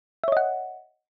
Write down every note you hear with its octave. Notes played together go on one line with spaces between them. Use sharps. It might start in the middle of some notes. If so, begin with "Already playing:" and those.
C#5 D#5 E5 F#5